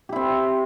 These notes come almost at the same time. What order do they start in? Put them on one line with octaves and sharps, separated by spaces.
G4 E4 C4